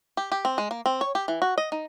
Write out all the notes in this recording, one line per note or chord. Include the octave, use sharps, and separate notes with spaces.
G4
G4
C4
G#3
A#3
C4
C#5
G4
E3
F#4
D#5
D#4